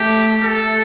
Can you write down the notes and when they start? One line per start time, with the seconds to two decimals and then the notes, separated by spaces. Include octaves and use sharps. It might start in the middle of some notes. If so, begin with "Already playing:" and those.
Already playing: A3 G4
0.43 A3 A4